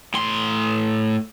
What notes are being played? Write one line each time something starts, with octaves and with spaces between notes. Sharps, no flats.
A2 C6